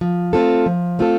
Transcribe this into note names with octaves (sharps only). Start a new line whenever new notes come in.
F3
A3 C4 F4 A4
F3
A3 C4 F4 A4